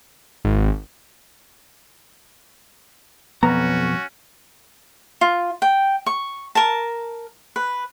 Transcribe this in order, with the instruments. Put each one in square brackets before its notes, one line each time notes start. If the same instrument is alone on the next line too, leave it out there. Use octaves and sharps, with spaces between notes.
[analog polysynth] G#1
[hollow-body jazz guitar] B1 F2 A#5 [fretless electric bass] B3 [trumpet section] C#4 F#4
[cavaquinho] F4
G5
C#6
A#4 A5
B4